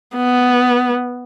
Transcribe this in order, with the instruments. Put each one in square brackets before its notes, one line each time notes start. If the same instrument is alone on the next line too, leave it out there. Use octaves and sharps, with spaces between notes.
[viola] B3